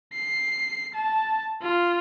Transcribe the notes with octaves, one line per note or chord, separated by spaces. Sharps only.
C7
A5
F4